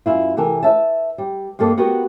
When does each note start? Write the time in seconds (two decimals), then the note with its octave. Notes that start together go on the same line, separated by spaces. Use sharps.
0.06 F#2 E4 F4
0.37 C3 E3 A4 A#4
0.63 B4 C#5 E5 A5
1.18 G3
1.59 G2 A#3 A4 D#5
1.77 B3 F#4 G4 A#4